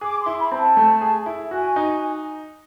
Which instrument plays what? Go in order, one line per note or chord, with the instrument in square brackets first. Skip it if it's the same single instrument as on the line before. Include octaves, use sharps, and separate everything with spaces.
[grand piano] G#4 [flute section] D6
[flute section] C6
[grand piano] E4
[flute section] B5
[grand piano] C4 [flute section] A#5
[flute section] A5
[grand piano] A3
G#4
E4
[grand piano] F#4 [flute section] G#5
[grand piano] D#4